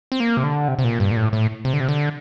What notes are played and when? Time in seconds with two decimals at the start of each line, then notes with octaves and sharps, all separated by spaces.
0.12 C4
0.20 A#3
0.37 C3
0.44 D3
0.68 C3
0.79 C3
0.84 A#2
1.00 G2
1.11 A#2
1.17 A2
1.33 A2
1.65 C3
1.73 D3
1.80 C3
1.89 D3